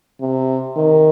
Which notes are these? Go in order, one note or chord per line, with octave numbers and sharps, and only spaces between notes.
C3
D#3